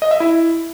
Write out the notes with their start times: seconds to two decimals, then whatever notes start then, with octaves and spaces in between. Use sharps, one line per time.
0.02 D#5
0.11 E5
0.20 E4